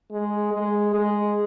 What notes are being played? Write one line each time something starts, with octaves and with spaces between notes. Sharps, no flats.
G#3
G#3
G#3